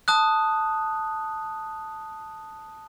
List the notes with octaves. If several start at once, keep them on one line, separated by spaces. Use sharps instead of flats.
A5 D#6 F#6